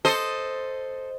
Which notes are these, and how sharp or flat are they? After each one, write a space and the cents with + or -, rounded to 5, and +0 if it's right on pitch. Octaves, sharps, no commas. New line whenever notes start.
A4 +0 C5 +0 D#5 +0